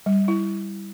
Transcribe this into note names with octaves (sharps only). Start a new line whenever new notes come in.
G3
E4